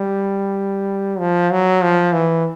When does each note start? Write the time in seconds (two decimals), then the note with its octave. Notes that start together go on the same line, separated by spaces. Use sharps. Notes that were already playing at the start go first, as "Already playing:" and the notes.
Already playing: G3
1.19 F3
1.51 F#3
1.82 F3
2.13 E3